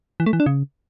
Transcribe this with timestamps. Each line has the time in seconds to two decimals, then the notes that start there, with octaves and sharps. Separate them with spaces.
0.20 E3
0.26 A3
0.33 E3
0.40 D4
0.46 C#3